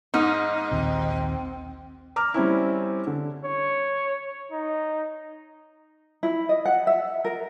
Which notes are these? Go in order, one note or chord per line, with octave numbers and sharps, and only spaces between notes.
G#2 D#4 F6
A#1 D#2 C4
A#5 D6 F6
G3 C4 C#4 E4
D3
C#5
D#4
E4
D#5
F#5
E5
A#4